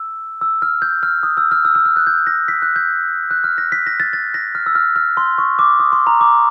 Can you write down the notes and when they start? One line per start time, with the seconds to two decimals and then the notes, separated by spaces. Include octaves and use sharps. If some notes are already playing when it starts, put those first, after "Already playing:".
Already playing: E6
0.41 E6
0.62 F6
0.82 G6
1.03 F6
1.23 D#6
1.37 E6
1.51 F6
1.65 E6
1.75 E6
1.85 F6
1.96 F#6
2.07 G6
2.27 A#6
2.48 B6
2.62 F#6
2.76 G6
3.31 F#6
3.44 F6
3.58 A#6
3.72 B6
3.87 A#6
4.00 A6
4.13 A6
4.34 A#6
4.55 F6
4.66 E6
4.75 F6
4.96 F6
5.17 C6
5.38 C#6
5.59 D6
5.80 D#6
5.92 C6
6.07 A#5
6.21 D6